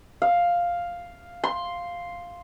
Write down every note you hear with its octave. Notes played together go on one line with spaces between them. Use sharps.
F5
C6